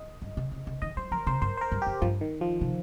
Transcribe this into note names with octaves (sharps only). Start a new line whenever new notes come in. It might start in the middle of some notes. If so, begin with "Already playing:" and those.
Already playing: D#5
G2
C3
C3
C3
D#3 D#5
G3 C5
F3 A#4
C3 C5
G2 C5
C5
A#4
G2
G4
F2
G2 F3
D#3
F3
C3